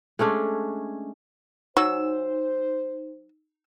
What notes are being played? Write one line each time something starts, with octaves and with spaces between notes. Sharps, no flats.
G#3 A3 C#4 D4
F#3 D#4 C5 E6